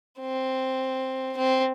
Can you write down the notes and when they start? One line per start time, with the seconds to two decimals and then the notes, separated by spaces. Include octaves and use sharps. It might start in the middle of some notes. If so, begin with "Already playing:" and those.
0.20 C4
1.37 C4